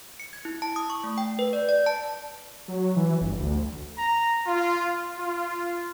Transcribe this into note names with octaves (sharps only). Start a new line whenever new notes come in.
C#7
G#6
E4
A5
D#6
C#6
A3
G5
B4
D5
D5
A5
F#3
E3
G1
D2
A#5
F4
F4